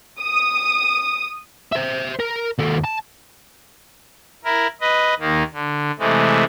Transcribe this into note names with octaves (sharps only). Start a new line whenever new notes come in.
D#6
C5 E5
A#4
D#2 A4
A5
E4 A#4
B4 D#5
D#2 D#3 A#3
D3
C3 E3 G#3 A3